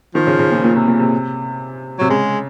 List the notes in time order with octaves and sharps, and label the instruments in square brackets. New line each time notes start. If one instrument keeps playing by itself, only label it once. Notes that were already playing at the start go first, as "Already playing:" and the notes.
[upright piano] D#3 [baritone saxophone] F3
[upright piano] C#3
C#3
A#2
A#2
C3
A#2
C3
[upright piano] C3 [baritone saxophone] F#3
[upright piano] C#3 [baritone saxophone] G#3